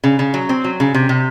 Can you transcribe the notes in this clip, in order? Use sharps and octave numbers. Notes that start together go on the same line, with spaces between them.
C#3
C#3
F#3
C4
F#3
C#3
C3
C3